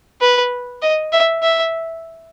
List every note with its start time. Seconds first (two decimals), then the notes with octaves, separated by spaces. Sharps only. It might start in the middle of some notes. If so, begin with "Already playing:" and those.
0.21 B4
0.82 D#5
1.13 E5
1.43 E5